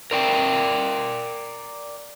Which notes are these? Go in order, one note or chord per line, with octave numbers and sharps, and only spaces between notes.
A#4 D5 G5